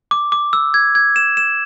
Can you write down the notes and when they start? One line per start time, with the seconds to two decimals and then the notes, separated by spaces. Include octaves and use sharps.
0.11 D6
0.32 D6
0.53 E6
0.74 G#6
0.95 G#6
1.16 E7
1.37 E7